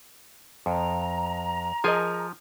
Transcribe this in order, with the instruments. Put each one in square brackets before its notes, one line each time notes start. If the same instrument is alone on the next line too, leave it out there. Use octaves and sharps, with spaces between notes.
[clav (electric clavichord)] F2 [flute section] A#5
[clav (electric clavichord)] F3 G#5 [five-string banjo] G#4 A#4 D#5